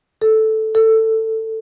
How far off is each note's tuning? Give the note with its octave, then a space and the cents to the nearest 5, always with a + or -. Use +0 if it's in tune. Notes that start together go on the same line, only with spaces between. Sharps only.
A4 -5
A4 +15